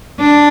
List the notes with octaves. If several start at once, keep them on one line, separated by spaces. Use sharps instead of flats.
D4